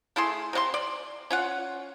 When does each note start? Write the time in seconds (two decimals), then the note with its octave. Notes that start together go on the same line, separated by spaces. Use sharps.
0.16 A3 E4 G#4 C6
0.53 C3 D4 C6
0.74 D5
1.30 C#4 F4 F#5